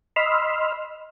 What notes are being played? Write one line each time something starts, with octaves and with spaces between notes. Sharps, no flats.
D#5 B5 C6 E6 F6